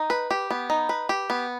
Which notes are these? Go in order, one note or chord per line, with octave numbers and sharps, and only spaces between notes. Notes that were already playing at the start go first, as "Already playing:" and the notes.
Already playing: D#4
B4
G4
B3
D#4
B4
G4
B3